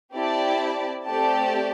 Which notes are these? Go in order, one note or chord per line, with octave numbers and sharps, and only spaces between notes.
C4 E4 G4 D5 A5
A3 C4 G4 D5 A5